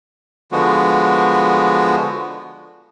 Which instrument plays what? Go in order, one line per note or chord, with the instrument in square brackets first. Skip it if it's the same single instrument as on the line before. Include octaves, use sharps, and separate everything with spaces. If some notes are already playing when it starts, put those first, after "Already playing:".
[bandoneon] D3 F3 G#3 B3 F#4